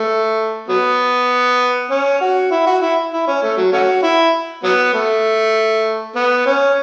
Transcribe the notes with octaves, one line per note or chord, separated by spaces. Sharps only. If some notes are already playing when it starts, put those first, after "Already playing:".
Already playing: A3
F#3 B3
C#4
F#4
E4
F#4
E4
E4
C#4
A3
F#3
A3 C#4 F#4
E4
F#3 B3
A3
B3
C#4